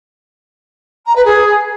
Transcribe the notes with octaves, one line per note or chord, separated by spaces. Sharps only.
A#5
B4
G#4